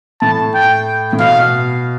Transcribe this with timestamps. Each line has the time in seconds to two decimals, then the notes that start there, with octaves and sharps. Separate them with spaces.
0.22 A2 A5
0.55 G5
1.13 A2
1.20 B2 F5